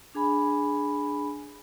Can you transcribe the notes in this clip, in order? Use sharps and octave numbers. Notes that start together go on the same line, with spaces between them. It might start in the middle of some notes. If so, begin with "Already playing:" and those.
D4 G#4 G#5 B5